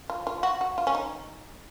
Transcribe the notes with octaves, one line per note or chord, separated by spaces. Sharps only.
F4
F4
F#4
F#4
F4
C#4
D#4